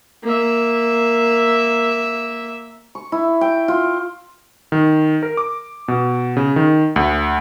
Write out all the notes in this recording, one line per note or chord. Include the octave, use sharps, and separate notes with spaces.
A#3 E5
C#6
E4
G5
F4
D#3
A#4
D6
B2
C#3
D#3
D2